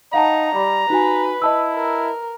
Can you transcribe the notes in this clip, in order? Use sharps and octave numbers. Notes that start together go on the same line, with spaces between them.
D#4 F5 F#5 A5 A#5
G3 B5
D#4 F#4 B4 G#5
E4 D#5 A5 E6
A#4